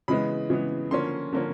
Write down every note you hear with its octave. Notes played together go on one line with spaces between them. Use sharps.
C#3 E3 G#3 B3 B5
C#3 E3 G#3 B3
D3 F3 A#3 C#4 C6
D3 F3 A#3 C#4